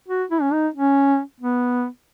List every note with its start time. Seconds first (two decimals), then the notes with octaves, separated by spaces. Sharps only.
0.08 F#4
0.31 E4
0.42 C#4
0.53 D#4
0.74 C#4
1.40 B3